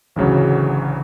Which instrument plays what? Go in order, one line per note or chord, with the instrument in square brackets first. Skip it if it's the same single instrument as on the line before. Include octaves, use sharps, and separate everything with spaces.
[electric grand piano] A1 D2 C#3 F#3